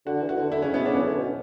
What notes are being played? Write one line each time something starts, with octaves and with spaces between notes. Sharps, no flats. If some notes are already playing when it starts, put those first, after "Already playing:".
D3 F#4
E3
F#4
D3
D3 E4
C#3 C#4
B2 B3
C#3 D4
E3 C#4
D3
B2